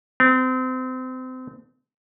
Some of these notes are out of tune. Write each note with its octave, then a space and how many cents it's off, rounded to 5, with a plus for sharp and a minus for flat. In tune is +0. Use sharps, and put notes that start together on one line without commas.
C4 -30